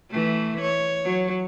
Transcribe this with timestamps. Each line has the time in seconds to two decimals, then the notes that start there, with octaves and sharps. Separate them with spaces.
0.10 E3 A3
0.61 C#5
1.05 F#3